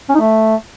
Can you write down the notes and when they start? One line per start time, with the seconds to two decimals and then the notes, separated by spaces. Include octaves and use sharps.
0.09 C#4
0.15 D#4
0.20 A3